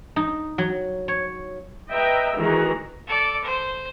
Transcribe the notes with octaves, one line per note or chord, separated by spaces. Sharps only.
D#4
F#3
C#5
B4 D#5 E5 G5 A#5
D#3 E3 A3 F#4 G#4 A#5
A4 D5
C5